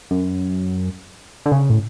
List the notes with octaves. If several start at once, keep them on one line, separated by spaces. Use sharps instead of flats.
F#2
D3
C#3
A2